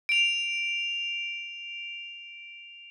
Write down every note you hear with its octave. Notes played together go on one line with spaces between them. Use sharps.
D7 F7